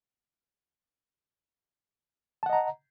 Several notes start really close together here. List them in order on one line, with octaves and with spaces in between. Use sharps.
A5 F#5 D#5 A#5